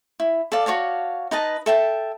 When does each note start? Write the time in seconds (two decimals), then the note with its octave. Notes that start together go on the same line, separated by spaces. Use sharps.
0.20 E4
0.52 A4 D5 F5
0.66 F#4 C#5 F5 A5
1.31 D#4 B4 D#5 A5
1.66 A4 E5 G5 A5